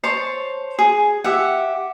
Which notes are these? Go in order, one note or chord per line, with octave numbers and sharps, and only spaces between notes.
C5 C#5 A5 C6
G#4
G4 E5 F#5